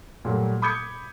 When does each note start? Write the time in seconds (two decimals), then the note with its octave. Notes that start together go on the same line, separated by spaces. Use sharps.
0.25 A#2 F#3 G3 A3
0.62 B5 D6 D#6 G6 G#6 C#7